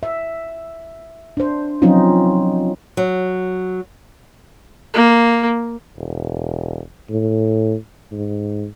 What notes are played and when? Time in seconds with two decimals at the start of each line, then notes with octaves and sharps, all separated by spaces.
0.03 E5
1.37 D4 C5
1.82 F3 F#3 C4 C#4 D#4 F4
2.97 F#3
4.94 A#3
5.97 E1
7.10 A2
8.12 G#2